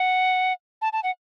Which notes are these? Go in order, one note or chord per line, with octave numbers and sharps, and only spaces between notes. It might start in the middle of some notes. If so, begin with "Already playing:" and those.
Already playing: F#5
A5
A5
F#5